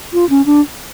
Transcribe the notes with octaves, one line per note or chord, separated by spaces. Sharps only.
F4
C#4
D4